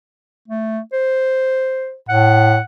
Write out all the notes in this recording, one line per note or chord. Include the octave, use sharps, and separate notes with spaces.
A3
C5
A2 F#5